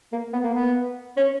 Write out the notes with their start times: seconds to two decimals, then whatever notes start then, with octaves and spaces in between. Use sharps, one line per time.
0.12 A#3
0.33 B3
0.44 A#3
0.54 B3
1.17 C#4